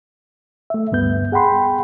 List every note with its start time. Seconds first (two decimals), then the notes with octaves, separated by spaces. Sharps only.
0.70 A3 E5
0.92 D2 G2 B3 G6
1.32 G#4 F#5 G5 B5 C6